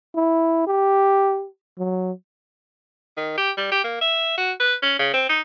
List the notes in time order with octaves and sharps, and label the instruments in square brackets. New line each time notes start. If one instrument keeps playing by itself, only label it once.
[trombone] E4
G4
F#3
[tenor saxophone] D#3
G4
G3
G4
A#3
E5
F#4
B4
C#4
C#3
C4
D#4